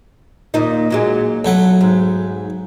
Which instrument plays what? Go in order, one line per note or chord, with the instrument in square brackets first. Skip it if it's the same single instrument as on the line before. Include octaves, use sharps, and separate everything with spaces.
[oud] D#2 A#2 D#4
A#2 F#3 G#3
[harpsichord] B1 F#3 F#5 [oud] A3
[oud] G#2